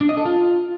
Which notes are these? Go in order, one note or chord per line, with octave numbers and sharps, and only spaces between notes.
D4
D#5
A4
F4